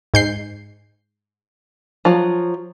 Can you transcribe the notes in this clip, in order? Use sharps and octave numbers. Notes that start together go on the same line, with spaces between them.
G#2 G6 C7
F3 F#3